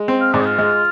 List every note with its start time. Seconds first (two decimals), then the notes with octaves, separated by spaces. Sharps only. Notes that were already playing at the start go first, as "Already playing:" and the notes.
Already playing: G#3
0.08 C4
0.21 F5
0.33 G#2 D5
0.41 D#4
0.46 F4
0.59 G#3